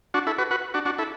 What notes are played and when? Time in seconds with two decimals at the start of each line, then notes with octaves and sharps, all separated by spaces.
0.14 D4 F#4
0.27 E4 A4
0.38 F#4 B4
0.51 F#4 B4
0.74 D4 F#4
0.85 D4 F#4
0.98 E4 A4